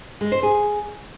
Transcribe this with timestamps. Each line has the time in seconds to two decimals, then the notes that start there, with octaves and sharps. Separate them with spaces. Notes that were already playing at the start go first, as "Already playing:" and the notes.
0.21 G#3
0.32 C5
0.43 G#4